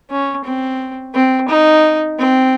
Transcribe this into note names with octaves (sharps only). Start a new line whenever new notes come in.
C#4
C4
C4
D#4
C4